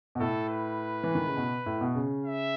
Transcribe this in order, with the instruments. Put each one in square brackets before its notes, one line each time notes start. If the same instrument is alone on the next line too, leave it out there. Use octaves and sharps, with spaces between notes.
[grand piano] B2
[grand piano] A2 [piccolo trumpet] A4
[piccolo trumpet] B4
[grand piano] E3
D#3
C#3
B2
A2
B2
C#3
[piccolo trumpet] E5